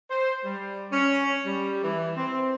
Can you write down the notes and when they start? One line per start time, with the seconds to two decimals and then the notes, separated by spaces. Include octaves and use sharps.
0.11 C5
0.44 G3
0.92 C#4
1.45 G3
1.84 E3
2.17 C4